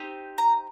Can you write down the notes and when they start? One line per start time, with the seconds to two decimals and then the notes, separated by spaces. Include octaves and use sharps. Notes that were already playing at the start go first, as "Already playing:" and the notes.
Already playing: C4 D#4 G4
0.38 A#5